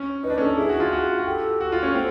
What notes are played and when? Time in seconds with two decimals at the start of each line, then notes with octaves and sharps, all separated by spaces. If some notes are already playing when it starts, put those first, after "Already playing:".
Already playing: C#4
0.23 D#4 B4
0.30 D4
0.38 C#4
0.41 D4 A4
0.57 E4 G#4
0.69 F#4
0.80 F4
0.92 F#4
1.19 F#4
1.26 G4 A4
1.61 F#4
1.72 F4
1.83 C#4
1.95 C4 A4